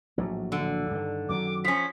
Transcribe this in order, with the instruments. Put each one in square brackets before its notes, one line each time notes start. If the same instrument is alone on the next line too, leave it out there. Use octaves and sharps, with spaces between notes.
[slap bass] A#1 A2 F#3
[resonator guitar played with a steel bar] D3
[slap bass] G2 D#3
[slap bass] F#2 D#3 F#3 [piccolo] D6
[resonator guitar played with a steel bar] F3 C#4 [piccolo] B6